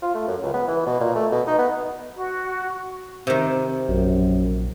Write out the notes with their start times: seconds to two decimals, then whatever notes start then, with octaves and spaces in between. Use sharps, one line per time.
0.02 F4
0.15 A3
0.28 F#2
0.42 C#2
0.54 B3
0.68 E3
0.86 B2
1.01 A#2
1.15 A3
1.32 B2
1.47 D#4
1.59 B3
2.14 F#4
3.27 C3 D#3 C4
3.89 A#1 F#2